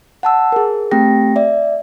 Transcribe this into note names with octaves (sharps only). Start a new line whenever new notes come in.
F#5 A5 E6
G#4 A#4
A3 C4 G4 G5 A#6
D5 E5